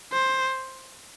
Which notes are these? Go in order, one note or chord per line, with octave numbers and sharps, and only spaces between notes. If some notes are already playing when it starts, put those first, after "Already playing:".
C5